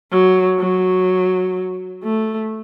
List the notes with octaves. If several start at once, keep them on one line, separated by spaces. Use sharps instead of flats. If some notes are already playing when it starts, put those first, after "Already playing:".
F#3
F#3
A3